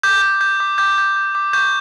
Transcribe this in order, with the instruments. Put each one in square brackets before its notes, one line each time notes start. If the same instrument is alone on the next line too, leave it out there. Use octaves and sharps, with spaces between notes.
[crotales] D6 G6
G6
G6
D6
D6 G6
G6
G6
D6
C#6 G6